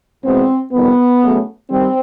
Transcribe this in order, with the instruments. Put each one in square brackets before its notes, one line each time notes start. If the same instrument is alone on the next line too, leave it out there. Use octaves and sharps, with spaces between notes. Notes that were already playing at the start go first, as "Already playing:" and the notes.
[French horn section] E2 B2 G#3 B3 C4
F2 C3 D#3 G3 B3
C#3 F#3 A3
D#3 G3 C4